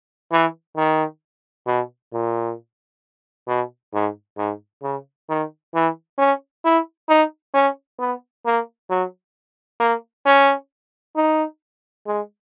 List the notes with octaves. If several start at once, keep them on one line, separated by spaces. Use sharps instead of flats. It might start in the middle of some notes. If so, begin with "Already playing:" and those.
E3
D#3
B2
A#2
B2
G#2
G#2
C#3
D#3
E3
C#4
E4
D#4
C#4
B3
A#3
F#3
A#3
C#4
D#4
G#3